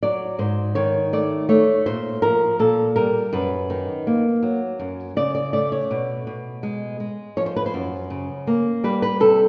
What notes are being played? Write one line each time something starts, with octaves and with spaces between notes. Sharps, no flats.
F#3 D5
G#2 C5
D#3 C#5
A3 D5
A3 C#5
A#2 C5
F3 A#4
A#2 A4
G3 A#4
F#2 B4
D#3
A#3
F#3
F#2
C#3 D5
D5
A3 D5
C#5
B2
B2
G#3
G#3
F3 C#5
C5
B4
C5
F#2
C#3
A#3
G3 B4
B4
C3 A4